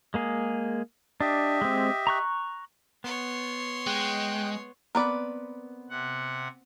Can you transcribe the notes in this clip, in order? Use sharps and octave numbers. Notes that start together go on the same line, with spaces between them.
G#3 A#3 G#4
D4 G4 D#5 E5
G#3 C4
A#5 C#6 F#6
B3 C#5 C6
G#3 G5 F#6
B3 C4 A#4 B4 D5 B5
C3 F#5